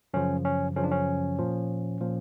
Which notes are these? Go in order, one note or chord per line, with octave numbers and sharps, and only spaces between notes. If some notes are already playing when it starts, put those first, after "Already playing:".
F#2 C#3 F3 C#4
C#4
F#2 C#3 F3 C#4
D4
C#4
A#2 F3
A#2 F3